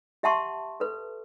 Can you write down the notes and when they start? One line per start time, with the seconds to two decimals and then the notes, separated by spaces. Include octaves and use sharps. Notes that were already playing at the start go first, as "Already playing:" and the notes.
0.23 G4 E5 F#5 A5 C6 C#6
0.80 A4 B4